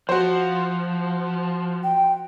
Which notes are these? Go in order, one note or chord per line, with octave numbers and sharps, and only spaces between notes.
F3 F#4 C5
G5